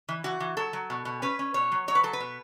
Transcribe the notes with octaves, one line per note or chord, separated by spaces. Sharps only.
E3
E3 F#4
E3
F#3 A4
F#3
B2
B2
C#4 B4
C#4
B2 C#5
F#3
F#3 C#5
B4
F#3 A4
B4
B2